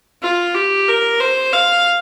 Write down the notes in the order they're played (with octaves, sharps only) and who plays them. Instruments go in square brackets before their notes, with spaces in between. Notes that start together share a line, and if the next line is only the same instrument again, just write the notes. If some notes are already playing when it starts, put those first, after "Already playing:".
[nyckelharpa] F4
G4
A#4
C5
F5